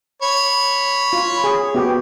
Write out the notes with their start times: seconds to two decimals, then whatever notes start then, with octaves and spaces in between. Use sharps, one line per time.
0.22 C#5 B5
1.13 F4
1.44 G#4
1.75 B3 F#4 G4